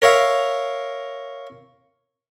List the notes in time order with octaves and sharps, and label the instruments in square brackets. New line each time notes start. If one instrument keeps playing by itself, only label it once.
[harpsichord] A#4 C#5 E5 F5